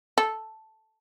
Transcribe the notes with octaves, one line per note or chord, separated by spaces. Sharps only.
A4